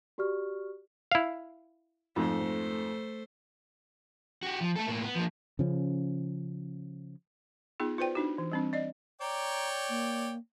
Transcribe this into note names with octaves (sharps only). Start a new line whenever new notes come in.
F#4 G4 D5 C#6 F6
E4 F5
F2 G#2 A3 C5
F#4 G4
F3
A3 A4
A2 A#3
B3
F3 A#3
C#3 F3 C#4
B3 D#4 F4 G#4
F4 F#4 B4 C5 D5 G5
D4 D#4 F#4
E3
G3 C4 D4
D5 D#5
C#5 D5 G5 A#5
A#3